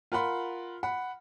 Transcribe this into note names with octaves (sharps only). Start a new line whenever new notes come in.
F4 A#4 F#5 B5 C6
F#5 B5